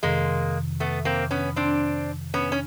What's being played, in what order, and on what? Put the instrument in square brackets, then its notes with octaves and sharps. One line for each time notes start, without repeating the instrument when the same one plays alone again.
[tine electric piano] F2 C3 D#3 [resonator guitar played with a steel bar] G#3 A#3
[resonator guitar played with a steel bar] A3 B3
A#3 C4
B3 C#4
C4 D4
B3 C#4
C#4